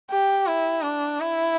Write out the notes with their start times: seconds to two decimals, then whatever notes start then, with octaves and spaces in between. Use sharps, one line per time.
0.11 G4
0.47 E4
0.83 D4
1.20 E4